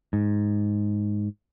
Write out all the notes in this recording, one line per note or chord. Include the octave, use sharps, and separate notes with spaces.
G#2